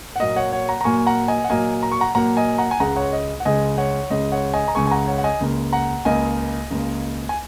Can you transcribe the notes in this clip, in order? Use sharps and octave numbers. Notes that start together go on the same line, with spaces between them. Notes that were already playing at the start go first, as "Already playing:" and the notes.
F#5
A#2 F#3 A#3 D#5
C#5 F#5
C#5 F#5
F#5 A#5
A#5
A#2 F#3 A#3 G#5 C#6
F#5 A#5
D#5 G#5
F#5
A#2 F#3 A#3 D#5 G#5
A#5
C#6
F#5 A#5
A#2 F#3 A#3 F#5 A#5
D#5 G#5
F#5 A#5
G#5
C#2 C#3 G#3 F#5 A#5
C#5 F#5
D#5
F#5
C#2 C#3 G#3 D#5 G#5
C#5 F#5
C#2 C#3 G#3 D#5
C#5 F#5
D#5 G#5
A#5
C#2 C#3 G#3 G#5 C#6
G#5
F#5 A#5
C#5 F#5
F#5
D#5 G#5
C#2 C#3 A#3
F#5 A#5
C#2 C#3 A#3 D#5 G#5
C#2 C#3 A#3
G#5